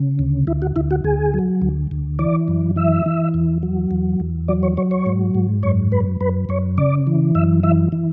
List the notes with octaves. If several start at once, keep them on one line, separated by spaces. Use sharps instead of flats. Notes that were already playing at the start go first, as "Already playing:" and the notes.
Already playing: C#3
D2
D2 E4
F#4
D2 E4
F#4
D2 G#4
F#3
D2
D2
E3 D5
F#2
E3 E5
E3
E2
F#3
E2
E2
F#3 D5
C#5
F#3 C#5
C#5
G#2
G#2
F#2 C#5
F#2 B4
F#2 B4
F#2 C#5
C#3 D5
E3
F#2 E5
E3 E5
E3